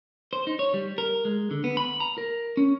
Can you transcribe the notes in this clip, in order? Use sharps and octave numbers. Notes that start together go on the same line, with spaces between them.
C5
D#4
C#5
G3
A#4
G#3
D3
B3
B5
A#5
A#4
C#4